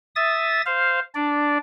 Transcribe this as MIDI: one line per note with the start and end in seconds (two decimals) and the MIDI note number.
0.16 0.61 76
0.16 0.61 87
0.16 0.61 93
0.66 1.00 72
0.66 1.00 77
1.15 1.58 62
1.15 1.58 74